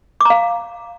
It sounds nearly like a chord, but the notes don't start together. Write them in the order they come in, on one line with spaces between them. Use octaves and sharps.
D6 A#5 F5